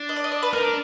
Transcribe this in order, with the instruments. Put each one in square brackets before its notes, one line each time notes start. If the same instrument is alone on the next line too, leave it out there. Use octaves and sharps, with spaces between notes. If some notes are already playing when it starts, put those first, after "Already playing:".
Already playing: [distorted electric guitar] D4
[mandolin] D#5
D5
D#5
D5
B4
[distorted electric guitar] D#4 [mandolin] A#4
[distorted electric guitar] D4